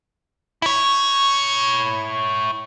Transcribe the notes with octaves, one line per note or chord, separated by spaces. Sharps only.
E4 C#5